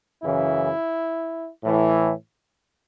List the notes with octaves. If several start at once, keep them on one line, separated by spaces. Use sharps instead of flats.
F#2 C#3 E3 E4
A2 E3